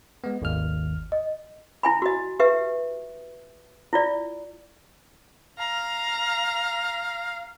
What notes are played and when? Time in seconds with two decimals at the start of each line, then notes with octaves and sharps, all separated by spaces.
0.24 G#3 B3
0.42 G#1 D#2 F6
1.12 D#5
1.83 E4 G#5 B5
2.02 F#4 D#5
2.40 G4 B4 E5
3.93 E4 F4 D5
5.58 F5 A#5